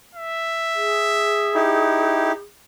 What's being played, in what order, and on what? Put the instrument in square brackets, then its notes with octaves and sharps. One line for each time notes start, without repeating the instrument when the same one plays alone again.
[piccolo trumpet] E5
[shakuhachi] G#4
[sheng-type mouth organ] D#4 E4 G4